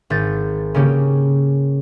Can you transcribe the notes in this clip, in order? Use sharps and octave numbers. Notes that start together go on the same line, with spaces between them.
G#1 G6 A6
C#3 A#3 C#4 G4